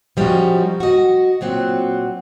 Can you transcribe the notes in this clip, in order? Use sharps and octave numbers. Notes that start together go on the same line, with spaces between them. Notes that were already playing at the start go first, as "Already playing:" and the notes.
F3 G3 B3 C#4 D#4 F#4
F#4 D#5
A#2 F#3 C4 F#5